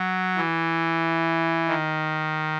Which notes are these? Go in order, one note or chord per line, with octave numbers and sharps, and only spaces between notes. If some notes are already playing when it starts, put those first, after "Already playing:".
Already playing: F#3
E3
D#3